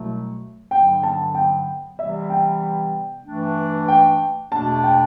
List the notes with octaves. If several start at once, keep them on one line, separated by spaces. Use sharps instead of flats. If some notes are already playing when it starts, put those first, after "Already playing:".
Already playing: C2 B2 F#3 A3
G2 D3 F#3 B3 G5
A5
G5
C3 E3 G3 B3 E5
G5
G2 E3 A3 D4
G5
E2 B2 A3 D4 A5
G5